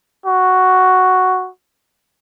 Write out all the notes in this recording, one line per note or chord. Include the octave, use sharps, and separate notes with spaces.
F#4